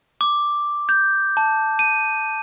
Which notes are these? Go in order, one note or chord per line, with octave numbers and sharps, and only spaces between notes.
D6
G6
A5
D#7